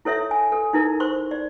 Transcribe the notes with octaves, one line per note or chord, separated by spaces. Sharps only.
E4 A4 C#5 E5
G#5
A4
D#4 E4 A#4
C5 C6 C#6
D5